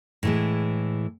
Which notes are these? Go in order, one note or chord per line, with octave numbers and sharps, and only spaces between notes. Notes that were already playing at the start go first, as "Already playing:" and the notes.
A2 E3 G#3